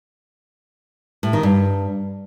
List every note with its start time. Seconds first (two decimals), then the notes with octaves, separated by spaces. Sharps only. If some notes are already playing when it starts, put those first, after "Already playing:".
1.23 A2
1.33 D#3
1.43 G2